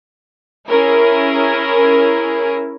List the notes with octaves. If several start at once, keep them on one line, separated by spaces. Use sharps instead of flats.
C#4 E4 G#4 A#4